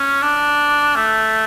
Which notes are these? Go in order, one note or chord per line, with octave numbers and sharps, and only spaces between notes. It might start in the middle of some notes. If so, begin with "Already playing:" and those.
Already playing: C#4
D4
A3